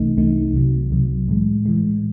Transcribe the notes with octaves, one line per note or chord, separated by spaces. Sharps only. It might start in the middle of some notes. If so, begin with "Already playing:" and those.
Already playing: C2 C3 E3 A3 D#4
C2 C3 E3 A3 D#4
C2 C3 F#3
C2 C3 F#3
A2 E3 G#3
A2 E3 G#3